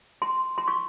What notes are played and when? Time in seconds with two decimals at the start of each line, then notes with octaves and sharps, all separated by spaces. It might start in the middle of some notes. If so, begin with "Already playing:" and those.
0.22 C6
0.58 C6
0.68 C#6